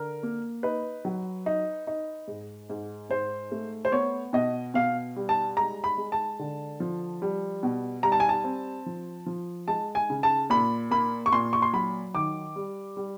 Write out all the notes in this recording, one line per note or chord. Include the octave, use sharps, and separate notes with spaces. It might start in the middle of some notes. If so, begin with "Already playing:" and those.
Already playing: D3 A#4
A#3
D#4 B4
F#3
D#4
D#4
G#2
G#2
G#2 C5
A3
C5
B3 C#5
B2 D#5
B2 F5
G3
A5
G#3 A#5
B5
G#3
A5
D3
F3
G3
B2
G3 A#5
A5
G#5
A5
C4
F3
F3
G#3 A5
G#5
C#3
A5
A#2 B5
A#3 B5
C#6
A#2 C6
C#6
C6
F#3 B5
D#3 D6
G3
G3